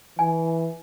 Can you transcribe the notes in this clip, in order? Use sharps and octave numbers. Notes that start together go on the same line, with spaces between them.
E3 G#5